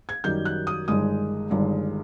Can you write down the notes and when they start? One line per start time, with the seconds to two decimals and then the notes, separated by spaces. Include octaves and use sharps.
0.09 G#6
0.24 F#2 D#3 G3 G6
0.45 F#6
0.67 D#6
0.88 G1 G2 D#3 G#3 D#6
1.51 G1 G2 D#3 G#3